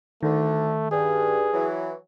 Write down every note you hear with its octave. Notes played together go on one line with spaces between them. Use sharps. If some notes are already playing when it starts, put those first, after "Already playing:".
D2 D3 D#3 A3
G2 G#4
E3 F#3